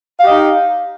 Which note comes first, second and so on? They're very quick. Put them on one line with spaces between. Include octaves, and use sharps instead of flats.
F5 G4 D#5 D#4